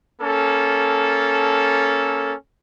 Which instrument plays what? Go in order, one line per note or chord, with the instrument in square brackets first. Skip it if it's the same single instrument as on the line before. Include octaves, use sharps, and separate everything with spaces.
[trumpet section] A#3 C#4 A4